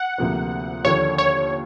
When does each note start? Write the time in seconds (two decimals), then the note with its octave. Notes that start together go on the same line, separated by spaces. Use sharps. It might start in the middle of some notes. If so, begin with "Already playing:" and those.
Already playing: F#5
0.18 D2 C3 F3 A#3
0.85 D#2 D3 F3 A#3 C#5
1.18 C#5